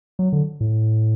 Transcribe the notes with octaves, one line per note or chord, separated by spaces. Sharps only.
F#3
D3
A2